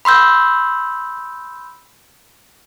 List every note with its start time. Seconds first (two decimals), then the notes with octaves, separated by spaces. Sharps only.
0.05 B5 C6 E6 G6